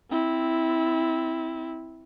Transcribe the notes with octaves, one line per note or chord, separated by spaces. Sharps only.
C4 E4